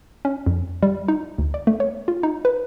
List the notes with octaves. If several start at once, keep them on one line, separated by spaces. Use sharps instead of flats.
C#4
F2
G3
D#4
D2
D5
A3
C#5
F4
D#4
B4